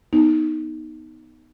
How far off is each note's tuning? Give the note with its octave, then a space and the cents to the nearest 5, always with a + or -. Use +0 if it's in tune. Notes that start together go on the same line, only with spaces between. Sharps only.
B3 -5 D#4 +0